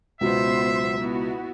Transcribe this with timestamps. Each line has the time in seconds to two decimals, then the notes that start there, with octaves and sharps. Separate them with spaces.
0.21 C#2 B2 F#3 B3 C5 E5
0.99 B3 E4 F#4